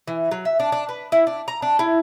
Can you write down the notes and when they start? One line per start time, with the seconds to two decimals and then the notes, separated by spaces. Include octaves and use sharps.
0.07 E3
0.31 F#3
0.45 E5
0.60 D4
0.72 D4
0.89 B4
1.12 E4
1.27 D4
1.48 A#5
1.62 D4
1.79 E4